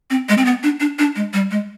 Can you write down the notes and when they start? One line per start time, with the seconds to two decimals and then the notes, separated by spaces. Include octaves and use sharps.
0.10 C4
0.29 G#3
0.38 C4
0.45 B3
0.63 D4
0.80 D4
0.99 D4
1.16 G#3
1.33 G3
1.51 G#3